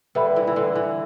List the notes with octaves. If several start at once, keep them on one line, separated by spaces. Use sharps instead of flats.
D3 G3 B4 E5 B5
E3
E3
D3
E3